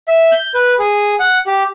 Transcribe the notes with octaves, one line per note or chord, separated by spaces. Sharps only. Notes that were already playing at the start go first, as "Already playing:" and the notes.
E5
G6
B4
G#4
F#5
G4